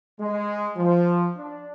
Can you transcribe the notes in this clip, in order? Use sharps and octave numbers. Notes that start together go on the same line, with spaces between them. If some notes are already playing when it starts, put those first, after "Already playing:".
G#3
F3
D4